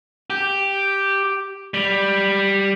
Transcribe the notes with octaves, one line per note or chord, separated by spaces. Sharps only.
G4
G3